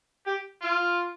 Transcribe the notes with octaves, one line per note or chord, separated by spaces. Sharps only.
G4
F4